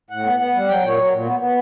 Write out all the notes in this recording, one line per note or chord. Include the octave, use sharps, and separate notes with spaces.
A2 F#5
B3
B3 F#5
G3
F#3 G5
A#2
C#5
F#3
A#2
B3
B3